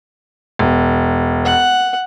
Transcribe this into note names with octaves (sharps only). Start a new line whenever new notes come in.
E1
F#5